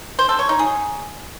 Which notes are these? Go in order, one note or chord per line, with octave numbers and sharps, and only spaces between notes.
C5
A4
C#5
D#4
G#4